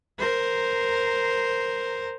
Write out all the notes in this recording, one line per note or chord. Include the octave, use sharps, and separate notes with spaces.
A#4 C5